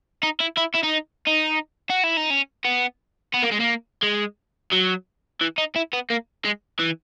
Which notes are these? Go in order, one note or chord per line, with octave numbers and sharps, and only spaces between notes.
D#4
E4
E4
E4
D#4
D#4
F#4
E4
D#4
C#4
B3
B3
A#3
G#3
A#3
G#3
F#3
E3
D#4
E4
B3
A#3
G#3
E3